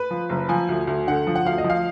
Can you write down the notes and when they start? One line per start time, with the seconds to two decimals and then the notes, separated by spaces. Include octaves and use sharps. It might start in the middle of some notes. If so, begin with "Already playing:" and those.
Already playing: B4
0.11 F3
0.30 F#1
0.49 F3 G#5
0.69 D2
0.87 D2
1.08 D3 F#5
1.27 F3
1.36 F#5
1.45 D2 F5
1.58 D#5
1.64 F3
1.70 F5